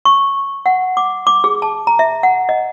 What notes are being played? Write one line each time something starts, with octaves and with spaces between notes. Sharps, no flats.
C#6
F#5
D6
D6
G#4
A5
A#5
E5
F#5
D#5